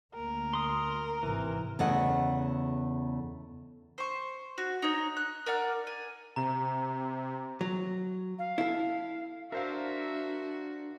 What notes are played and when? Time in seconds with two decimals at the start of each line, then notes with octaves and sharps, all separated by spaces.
0.14 D2 A#3 A#4
0.53 C6 D#6
1.23 G#1 C3 E3
1.79 E2 C#3 A3 D#5 F#5
3.98 C5 C#6
4.58 F#4
4.82 D#4 C#5
5.17 F#6
5.46 A#4 D5 F#5 F6
5.87 G#5
6.36 C3 A#5
7.61 F#3
8.39 F5
8.58 E4 A4
9.52 D4 F#4 A#4 C5 E5 F5